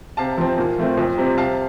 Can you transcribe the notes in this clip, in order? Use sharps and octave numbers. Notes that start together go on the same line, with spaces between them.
C3 F5 A5
F3 C4
A#2
F3 A3 C4
F2
C3 G3 C4
C3 F5 A5